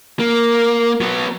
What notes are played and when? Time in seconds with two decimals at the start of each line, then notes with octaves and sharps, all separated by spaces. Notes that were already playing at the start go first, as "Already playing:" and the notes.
0.19 A#3
1.01 F#3 B3